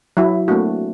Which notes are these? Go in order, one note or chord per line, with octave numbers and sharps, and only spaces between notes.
F#3 E4
A3 A#3 C4 D4 F#4